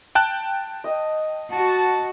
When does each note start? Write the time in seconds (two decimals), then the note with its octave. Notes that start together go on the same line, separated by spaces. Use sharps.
0.15 G5 A5 F#6
0.84 D#5
1.53 F#4 A5